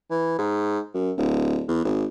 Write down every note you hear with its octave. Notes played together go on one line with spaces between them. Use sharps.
E3
G#2
F#2
D1
E2
G#1